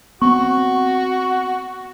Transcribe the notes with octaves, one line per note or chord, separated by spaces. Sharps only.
B3 C4 F#4 C#6